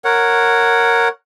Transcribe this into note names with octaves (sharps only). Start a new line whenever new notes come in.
A#4 C#5 F#5